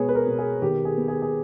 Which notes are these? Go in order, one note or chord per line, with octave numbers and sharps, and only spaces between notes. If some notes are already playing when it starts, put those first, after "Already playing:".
Already playing: B2 G#3 B3 G#4 C#5
B4
A#4
B2
G#4
D#3 G4
G#4
B3
G#4
G#4